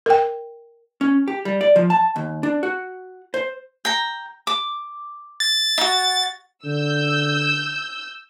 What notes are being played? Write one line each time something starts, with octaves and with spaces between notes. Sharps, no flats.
A#4 G5
C#4
G4
G3
D5
F3
A5
D#2
D4
F#4
C5
G5 A#5
D6
A6
D#4 F#4
D3 E6 G6